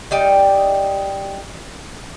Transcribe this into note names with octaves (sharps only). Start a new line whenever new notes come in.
G3 D#4 D5 G5